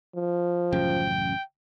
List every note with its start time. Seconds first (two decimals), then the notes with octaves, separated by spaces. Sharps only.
0.16 F3
0.72 A1 F#2 C#3 G5